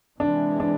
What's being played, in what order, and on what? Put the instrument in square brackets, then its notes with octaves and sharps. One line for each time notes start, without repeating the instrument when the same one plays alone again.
[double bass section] C3 E3 G#3 [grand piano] D4
[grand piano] D4